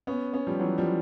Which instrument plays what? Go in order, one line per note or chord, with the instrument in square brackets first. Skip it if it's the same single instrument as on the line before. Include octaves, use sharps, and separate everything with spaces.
[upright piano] B3 C#4
B3 C#4
F3 G3
E3 F#3
F3 G3